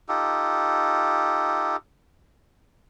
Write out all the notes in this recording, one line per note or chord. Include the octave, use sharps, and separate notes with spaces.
D#4 F4 G4 A4